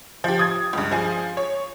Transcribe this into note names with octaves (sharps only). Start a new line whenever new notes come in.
F3 G4
D#6 G#6
C#2 G2
F3 G#4
C#5